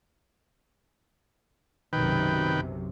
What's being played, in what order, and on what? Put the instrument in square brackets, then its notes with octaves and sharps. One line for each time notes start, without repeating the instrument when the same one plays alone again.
[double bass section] B1 F#2 C3 [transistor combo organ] D#3 B4 G5